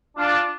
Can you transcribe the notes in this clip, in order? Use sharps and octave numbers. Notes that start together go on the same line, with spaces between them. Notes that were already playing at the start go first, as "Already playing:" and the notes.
D4 F4